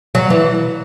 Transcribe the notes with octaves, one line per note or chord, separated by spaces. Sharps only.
F#3
E3